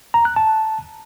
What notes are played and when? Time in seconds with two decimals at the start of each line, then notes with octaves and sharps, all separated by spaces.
0.14 A#5
0.25 F#6
0.36 A5